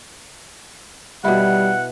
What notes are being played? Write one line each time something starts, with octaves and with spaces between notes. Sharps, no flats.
B2 G3 E4 F#5